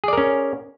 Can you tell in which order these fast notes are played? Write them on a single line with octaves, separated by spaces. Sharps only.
G#4 D5 A#4 C#4